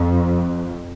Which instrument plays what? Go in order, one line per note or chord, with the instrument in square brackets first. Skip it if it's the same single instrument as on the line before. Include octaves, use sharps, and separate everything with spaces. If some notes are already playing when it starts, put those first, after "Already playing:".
Already playing: [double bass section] F2